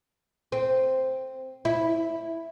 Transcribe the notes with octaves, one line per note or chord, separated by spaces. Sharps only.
C4
E4